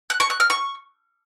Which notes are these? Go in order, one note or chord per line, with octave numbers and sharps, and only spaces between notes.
F#6
C#6
F#6
F6
C#6